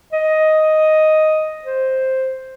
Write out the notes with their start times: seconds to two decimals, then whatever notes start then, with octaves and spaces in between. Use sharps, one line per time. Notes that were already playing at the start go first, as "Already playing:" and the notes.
0.13 D#5
1.64 C5